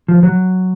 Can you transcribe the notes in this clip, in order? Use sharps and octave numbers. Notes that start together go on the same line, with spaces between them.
F3
F#3